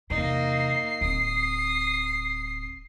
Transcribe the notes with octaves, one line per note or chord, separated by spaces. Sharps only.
E2 C3 A#3 D#4 C7
D1 C4 D#6